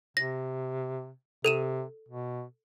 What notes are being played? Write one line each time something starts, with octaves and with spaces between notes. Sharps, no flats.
C3 A#6
C3 A4 D#7 E7
B2